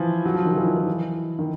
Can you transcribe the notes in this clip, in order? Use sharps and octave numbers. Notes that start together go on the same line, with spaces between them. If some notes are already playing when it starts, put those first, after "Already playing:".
Already playing: E3 F3
F#3
F3
D#3
F3
E3
D#3
E3
E3
D#3